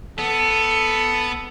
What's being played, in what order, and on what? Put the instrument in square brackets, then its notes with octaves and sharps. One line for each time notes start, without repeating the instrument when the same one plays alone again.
[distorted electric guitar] B3 [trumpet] A4